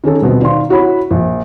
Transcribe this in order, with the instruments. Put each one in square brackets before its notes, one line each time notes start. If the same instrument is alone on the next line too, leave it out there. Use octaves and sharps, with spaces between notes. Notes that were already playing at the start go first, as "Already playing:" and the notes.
[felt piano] D#3 C#4 G#4 A4
D#1 B2 C4
D#3 D5 F5 C6
E4 F#4 C#5 B5
A#1